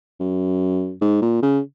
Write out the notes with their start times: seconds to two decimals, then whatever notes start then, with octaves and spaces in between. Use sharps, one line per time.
0.20 F#2
1.01 G#2
1.22 A#2
1.42 C#3